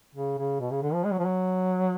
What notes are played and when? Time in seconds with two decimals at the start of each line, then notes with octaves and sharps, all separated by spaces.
0.15 C#3
0.38 C#3
0.60 B2
0.71 C#3
0.82 D3
0.93 F3
1.05 G#3
1.11 F#3
1.19 F3
1.26 F#3